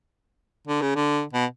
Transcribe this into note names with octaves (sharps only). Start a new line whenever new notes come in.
D3
C#3
D3
B2